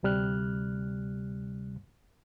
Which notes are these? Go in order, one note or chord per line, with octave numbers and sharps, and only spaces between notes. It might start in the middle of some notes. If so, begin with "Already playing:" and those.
D2 C3 G3 F6 F#6